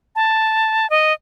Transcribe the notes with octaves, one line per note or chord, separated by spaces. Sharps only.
A5
D#5